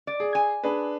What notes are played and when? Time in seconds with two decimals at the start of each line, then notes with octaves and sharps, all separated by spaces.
0.07 D5
0.20 G#4
0.35 G#5
0.64 D4 G#4 B4